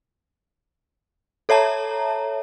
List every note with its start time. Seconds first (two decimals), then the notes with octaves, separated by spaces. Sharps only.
1.49 A4 C#5 E5 A5 A#5